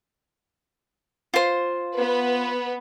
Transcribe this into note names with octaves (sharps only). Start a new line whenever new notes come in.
F4 C5
B3 B4